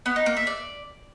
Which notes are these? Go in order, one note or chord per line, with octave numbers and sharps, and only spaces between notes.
B3
D#4
A#3
E5
D5